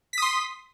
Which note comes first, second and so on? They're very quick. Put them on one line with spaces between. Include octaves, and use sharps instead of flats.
B6 D#6 C6